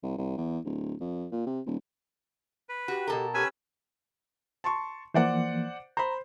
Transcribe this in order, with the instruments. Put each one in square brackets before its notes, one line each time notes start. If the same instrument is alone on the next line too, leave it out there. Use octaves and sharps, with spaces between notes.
[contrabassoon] C2
C2
E2
D1
F2
A#2
C3
D#1
[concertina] B4
[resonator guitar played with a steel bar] F#4 [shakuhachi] G4
[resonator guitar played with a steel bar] B2 A4 A#4
[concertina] C#4 B4 E6 [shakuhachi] G4 [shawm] G#5
[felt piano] A5 C6 C#6
[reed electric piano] E3 F3 A#3 [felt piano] C5 D5 F#5
[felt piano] C5 B5 [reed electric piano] A#5